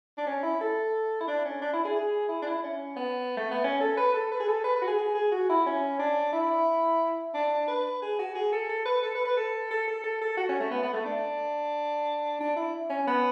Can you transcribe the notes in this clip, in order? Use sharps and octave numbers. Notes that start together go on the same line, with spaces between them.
D4
C#4
E4
A4
E4
D4
C#4
D4
E4
G#4
G#4
E4
D4
E4
C#4
B3
A3
B3
C#4
A4
B4
A4
B4
G#4
A4
B4
B4
F#4
G#4
G#4
G#4
F#4
E4
C#4
D4
E4
D4
B4
G#4
F#4
G#4
A4
A4
B4
A4
B4
B4
A4
A4
A4
A4
A4
F#4
C#4
A3
B3
B3
A3
D4
D4
E4
C#4
B3